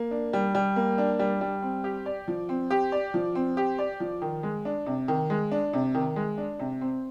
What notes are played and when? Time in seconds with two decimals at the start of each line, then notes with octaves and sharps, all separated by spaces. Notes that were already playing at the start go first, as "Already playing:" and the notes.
Already playing: A#3
0.11 D4
0.33 G3
0.55 G3
0.76 A#3
0.98 D4
1.19 G3
1.41 G3
1.62 C4
1.84 G4
2.06 D5
2.28 F3
2.49 C4
2.70 G4
2.92 D5
3.14 F3
3.35 C4
3.57 G4
3.78 D5
4.00 F3
4.22 D#3
4.43 G#3
4.65 D4
4.86 C3
5.08 D#3
5.30 G#3
5.52 D4
5.73 C3
5.95 D#3
6.16 G#3
6.38 D4
6.59 C3
6.81 C4